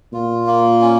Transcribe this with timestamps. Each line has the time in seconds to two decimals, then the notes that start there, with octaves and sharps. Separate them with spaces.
0.13 A#2 F4
0.47 A#3
0.82 C#4